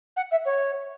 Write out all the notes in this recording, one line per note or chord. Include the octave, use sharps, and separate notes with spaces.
F#5
E5
C#5